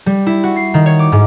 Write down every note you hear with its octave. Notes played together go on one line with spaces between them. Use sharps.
G3
E4
F#4
C7
D#3
C#5
D6
G#2